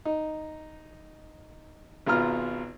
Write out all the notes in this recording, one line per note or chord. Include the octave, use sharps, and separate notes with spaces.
D#4
G#1 B2 B3 F4 A#5 F6